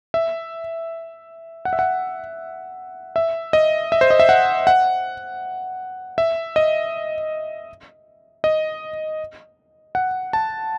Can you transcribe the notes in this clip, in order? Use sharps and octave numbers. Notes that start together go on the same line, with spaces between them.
E5
F#5
E5
F#5
E5
D#5
E5
C5
D#5
E5
F#5
F#5
E5
D#5
D#5
F#5
A5